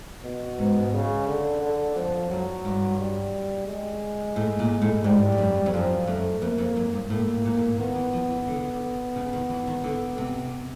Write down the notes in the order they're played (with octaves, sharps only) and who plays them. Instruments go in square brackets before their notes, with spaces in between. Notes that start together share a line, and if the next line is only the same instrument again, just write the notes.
[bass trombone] B2
[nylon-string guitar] G#2
[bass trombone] C#3
D3
D3
[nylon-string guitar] F2 [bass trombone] F3
[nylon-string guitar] F#2 [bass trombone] F#3
[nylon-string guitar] G2
[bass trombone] G3
G#3
[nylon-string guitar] A2
A#2
A2
[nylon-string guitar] G#2 [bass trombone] G3
[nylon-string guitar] G2
F#2
F2
[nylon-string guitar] F#2 [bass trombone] F3
[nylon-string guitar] F#2 [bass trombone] A3
[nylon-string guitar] F2 [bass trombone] A#3
[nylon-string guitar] F2
F#2
G2
[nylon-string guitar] A2 [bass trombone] A#3
[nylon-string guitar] A#2
A2
A#2
[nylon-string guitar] D#3 [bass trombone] B3
[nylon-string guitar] E3
F3
E3
D3
C#3
D#3
E3
D#3
D3
C3